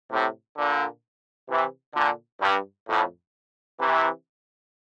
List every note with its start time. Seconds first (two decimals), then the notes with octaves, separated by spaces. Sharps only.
0.11 A2 C3
0.57 A#2 D3
1.49 C3 E3
1.95 A#2 D3
2.41 G2
2.88 F2 A2
3.79 C3 E3